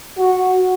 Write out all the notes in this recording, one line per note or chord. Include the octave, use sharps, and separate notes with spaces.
F#4